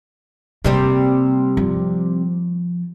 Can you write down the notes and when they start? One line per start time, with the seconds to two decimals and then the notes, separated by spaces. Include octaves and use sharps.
0.64 C3 G3 A#3 C4
1.57 F3